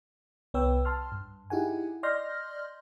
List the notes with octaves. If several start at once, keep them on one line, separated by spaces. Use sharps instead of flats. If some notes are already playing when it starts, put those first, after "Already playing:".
C2 B3 B4 C#5 G5 E6
A5 C6 F6
G2
D#4 E4 G4 G#4 F#5 G#5
D5 D#5 C6 F6 G6 A#6